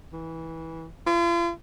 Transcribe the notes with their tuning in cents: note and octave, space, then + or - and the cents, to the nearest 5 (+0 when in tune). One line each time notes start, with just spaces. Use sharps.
E3 -20
F4 -40